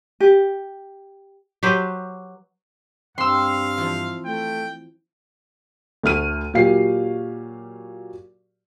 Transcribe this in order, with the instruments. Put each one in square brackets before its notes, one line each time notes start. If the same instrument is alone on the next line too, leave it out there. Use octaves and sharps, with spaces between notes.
[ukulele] G4
[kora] F#3 G4 B4 C5
[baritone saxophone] G2 [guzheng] C4 [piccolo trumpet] F5 [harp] C6 E6
[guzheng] E3 F3 F4
[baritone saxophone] A3 [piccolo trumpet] G5
[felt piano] D2 A3 F6 D#7
A#2 F#3 G4 F5 C7